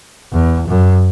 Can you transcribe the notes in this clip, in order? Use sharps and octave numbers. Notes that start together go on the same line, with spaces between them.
E2
F#2